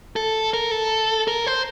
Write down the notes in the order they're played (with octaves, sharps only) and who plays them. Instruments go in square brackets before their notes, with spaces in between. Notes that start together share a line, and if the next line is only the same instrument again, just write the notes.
[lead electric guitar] A4
A#4
A4
A#4
C5